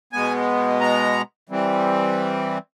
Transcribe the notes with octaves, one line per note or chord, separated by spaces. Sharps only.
B2 G#3 B3 G#5
A#5
E3 G3 C4